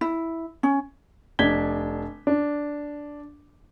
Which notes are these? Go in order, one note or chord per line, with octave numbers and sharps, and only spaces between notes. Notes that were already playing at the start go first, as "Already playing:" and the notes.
E4
C#4
F1 D4 G#6 B6 G7
D4